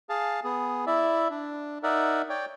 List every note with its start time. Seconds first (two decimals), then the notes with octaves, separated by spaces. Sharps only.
0.09 G#4 F5 A5
0.44 B3 G#4
0.87 E4 D5 E5
1.30 D4
1.83 D#4 A#4 D5 E5 F#5
2.29 C#5 D5 G5